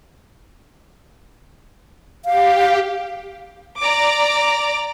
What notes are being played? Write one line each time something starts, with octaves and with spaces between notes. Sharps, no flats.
G4 F5
D5 A#5 D6